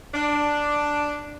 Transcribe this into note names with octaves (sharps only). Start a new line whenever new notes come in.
D4